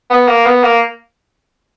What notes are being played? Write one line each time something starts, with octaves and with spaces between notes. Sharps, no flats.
B3
A#3
B3
A#3